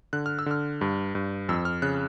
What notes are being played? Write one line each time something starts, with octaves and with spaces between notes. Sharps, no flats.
D3 F#6
F6
E6
D3 F6
G2
G2
F2 E6
F6
C#3 F#6